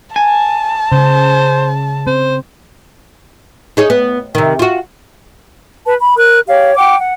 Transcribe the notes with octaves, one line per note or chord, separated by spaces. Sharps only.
G#5 A5
C#3 C5
C4 C5
D#4 G#4 C#5
B3
C3 D#3
F4 F#4
B4 A5
B5
A#4 F#6
G4 C#5 F5
F#5 G5 D6
F#5